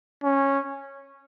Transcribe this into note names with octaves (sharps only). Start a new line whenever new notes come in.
C#4